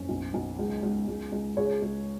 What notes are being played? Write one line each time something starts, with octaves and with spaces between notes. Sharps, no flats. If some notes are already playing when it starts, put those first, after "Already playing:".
Already playing: F#1 C#4
B1
B1
C#2
C#2
C#2
C#2
C#2 G#4 C#5
C#2